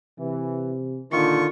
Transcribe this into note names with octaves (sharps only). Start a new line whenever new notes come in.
C3 E3
A#2 D3 D#3 F4 C#6